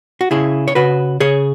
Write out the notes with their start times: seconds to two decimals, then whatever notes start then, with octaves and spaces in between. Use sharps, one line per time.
0.21 F#4
0.31 C#3 E4 G#4
0.68 C#5
0.75 C#3 F#4 B4
1.20 C#3 G#4 C#5